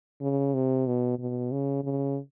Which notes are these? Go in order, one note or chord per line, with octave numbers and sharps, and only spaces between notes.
C#3
C3
B2
B2
C#3
C#3